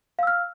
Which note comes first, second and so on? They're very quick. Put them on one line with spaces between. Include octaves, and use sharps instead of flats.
F5 E6 F6